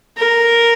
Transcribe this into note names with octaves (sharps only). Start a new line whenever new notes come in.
A#4